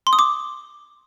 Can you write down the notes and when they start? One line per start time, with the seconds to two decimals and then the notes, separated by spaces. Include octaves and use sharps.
0.07 C6
0.13 D#6
0.19 D6